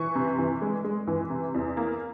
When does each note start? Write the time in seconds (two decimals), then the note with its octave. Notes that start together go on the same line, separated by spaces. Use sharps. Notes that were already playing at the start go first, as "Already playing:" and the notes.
Already playing: E3 C#6
0.15 C3
0.38 E3
0.62 G#3
0.84 G#3
1.07 E3
1.30 C3
1.54 E2
1.77 A#3